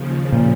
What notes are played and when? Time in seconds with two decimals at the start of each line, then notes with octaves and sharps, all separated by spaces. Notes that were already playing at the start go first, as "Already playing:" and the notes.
Already playing: D#2 C#3 F3
0.32 A#2